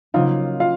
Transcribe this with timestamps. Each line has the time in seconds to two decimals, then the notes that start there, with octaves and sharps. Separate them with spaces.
0.14 C#3 F#3 A#3 D#4 F4 A#4 F5
0.60 F4 F5